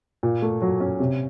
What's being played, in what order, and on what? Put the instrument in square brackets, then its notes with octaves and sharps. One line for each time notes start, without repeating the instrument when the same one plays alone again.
[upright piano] A#2
A3
F#3
C#4
C3